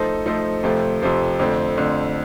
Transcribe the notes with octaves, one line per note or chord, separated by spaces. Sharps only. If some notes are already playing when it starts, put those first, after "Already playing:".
Already playing: F3 A3 D#4 A4 C5
F3 A3 D#4 A4 C5
F2 C3 F3 A3
F2 C3 F3 A3
F2 D3 A3 C4
F2 D3 A3 C4